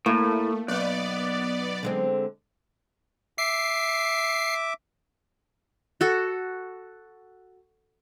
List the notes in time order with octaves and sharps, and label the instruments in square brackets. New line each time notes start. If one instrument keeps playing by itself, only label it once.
[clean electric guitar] A2 [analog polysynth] A3 [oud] A#3
[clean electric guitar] B1 [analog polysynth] B3 D5
[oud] D3 G#3 C4
[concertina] E5 D6 [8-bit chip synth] C7
[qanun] F#4 A4